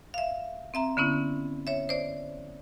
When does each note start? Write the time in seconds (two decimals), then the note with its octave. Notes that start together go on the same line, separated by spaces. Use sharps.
0.14 E5 F5
0.74 C4 E5 A#5
0.97 D3 B3 C#4 E4
1.67 C#5 E5
1.89 C5 D5